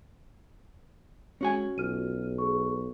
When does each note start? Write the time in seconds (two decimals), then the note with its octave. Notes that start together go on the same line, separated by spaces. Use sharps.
1.41 G#3 C#4 F#4 G#5
1.78 B1 F4 F6 D#7
2.38 G#4 C#6